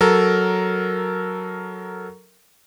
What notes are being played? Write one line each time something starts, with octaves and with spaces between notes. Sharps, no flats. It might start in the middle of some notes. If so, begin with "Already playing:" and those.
F#3 A4 A#4